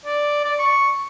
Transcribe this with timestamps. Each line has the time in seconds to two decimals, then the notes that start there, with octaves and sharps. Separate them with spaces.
0.05 D5
0.44 D5
0.59 C#6